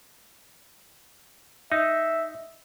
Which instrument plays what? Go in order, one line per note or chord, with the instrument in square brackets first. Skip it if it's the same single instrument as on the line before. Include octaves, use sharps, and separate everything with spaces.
[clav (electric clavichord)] D#4 [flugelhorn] E5